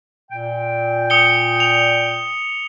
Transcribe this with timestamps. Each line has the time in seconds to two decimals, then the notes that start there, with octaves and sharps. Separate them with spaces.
0.31 A#2 G5
1.10 D#6 C#7 G7
1.60 F7